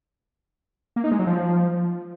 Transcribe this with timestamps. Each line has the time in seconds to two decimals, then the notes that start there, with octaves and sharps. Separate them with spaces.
0.96 A#3
1.04 D#4
1.12 G#3
1.19 F#3
1.27 F3